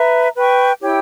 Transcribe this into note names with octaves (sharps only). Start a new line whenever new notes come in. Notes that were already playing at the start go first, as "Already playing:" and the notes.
Already playing: B4 E5 A#5
B4 G5 C#6
E4 G4 C#5 G5